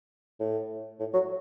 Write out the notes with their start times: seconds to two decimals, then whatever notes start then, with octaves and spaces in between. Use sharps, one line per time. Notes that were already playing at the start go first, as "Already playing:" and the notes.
0.40 A2
1.00 A2
1.14 F#3